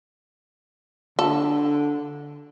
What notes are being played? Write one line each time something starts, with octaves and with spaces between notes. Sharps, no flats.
D3 A4